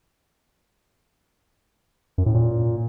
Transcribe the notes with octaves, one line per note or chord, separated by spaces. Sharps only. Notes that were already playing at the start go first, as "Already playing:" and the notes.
F#2
A2
A#2